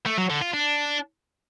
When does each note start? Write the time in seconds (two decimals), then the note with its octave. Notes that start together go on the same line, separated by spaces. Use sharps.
0.06 A3
0.18 F#3
0.30 D3
0.42 F4
0.54 D4